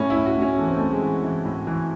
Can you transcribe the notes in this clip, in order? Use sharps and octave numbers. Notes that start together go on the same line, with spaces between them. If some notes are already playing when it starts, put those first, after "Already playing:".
Already playing: A2 C#4
E4
A2
F#4
A2 C#4
E3 A3
C4
A2 A3
G#3
E3
E3
A2
E3